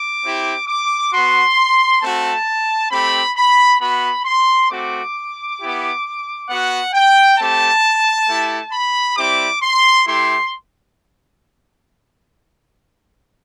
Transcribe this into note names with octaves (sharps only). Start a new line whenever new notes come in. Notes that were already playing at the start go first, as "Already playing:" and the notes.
Already playing: D6
C4 E4 G4
D6
B3 F#4 C6
A3 C4 F#4 A5
A3 C4 G4 B5
B5
B3 F#4 B5
C6
A3 C4 F#4 D6
B3 E4 G4
B3 F#4 F#5
G5
A3 C4 G4 A5
A3 E4 G4
B5
G3 C4 E4 G4 D6
C6
A3 E4 G4 C6